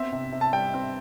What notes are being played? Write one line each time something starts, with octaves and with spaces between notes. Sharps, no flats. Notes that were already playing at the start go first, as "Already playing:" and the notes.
Already playing: B3 C4 E5
C3
C3
A5
G3 G5
C4